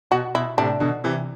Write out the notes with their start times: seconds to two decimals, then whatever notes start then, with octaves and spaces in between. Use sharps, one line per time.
0.11 B2 F#4
0.34 B2 E4
0.58 A2 C3 D4
0.80 B2 D3
1.04 C3 E3